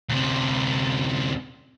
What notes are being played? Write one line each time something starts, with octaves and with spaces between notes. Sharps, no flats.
D2 C3